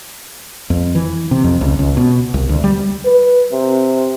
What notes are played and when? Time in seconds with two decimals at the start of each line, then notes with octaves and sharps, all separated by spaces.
0.70 F2
0.95 E3
1.31 C3
1.44 F2
1.61 C#2
1.79 C#2
1.97 B2
2.34 C2
2.49 D2
2.64 G3
3.05 B4
3.52 C3